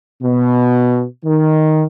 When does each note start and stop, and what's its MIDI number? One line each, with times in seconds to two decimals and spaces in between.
0.22 1.04 47
1.25 1.83 51